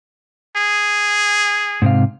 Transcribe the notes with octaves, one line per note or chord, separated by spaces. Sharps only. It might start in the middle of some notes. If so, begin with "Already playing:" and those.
G#4
G#2 C3 F5